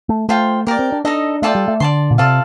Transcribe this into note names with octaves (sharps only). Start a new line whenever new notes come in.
A3
A3 F4 C5 G5
A#3 G4 A#4 D5
C4
D4
D4 D#4 A4 D#5
A3 F4 A4 D5 G5
G3
A3
D3 D5 A5 C6
A#2
C3 F4 A4 D5 F5